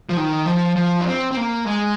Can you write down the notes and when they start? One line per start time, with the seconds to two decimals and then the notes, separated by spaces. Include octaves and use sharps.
0.09 F3
0.17 D#3
0.46 F3
0.76 F3
1.01 D4
1.07 C4
1.31 C4
1.37 A#3
1.66 G#3